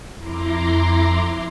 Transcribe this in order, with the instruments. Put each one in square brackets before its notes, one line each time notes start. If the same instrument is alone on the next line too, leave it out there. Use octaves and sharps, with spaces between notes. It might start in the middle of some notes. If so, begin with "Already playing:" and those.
[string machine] F2 E4 A#5 C6 D6